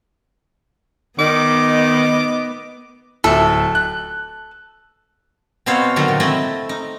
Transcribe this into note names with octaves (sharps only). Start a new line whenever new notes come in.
D#3 B3 D#5 D6
D1 A4 E5
F#6
B2 B3 C4 C5 C#5 F5
D3 D#3 F#3 D#4 A4 A#4
A#2
A3 C4 E4 A4 D#5
D#4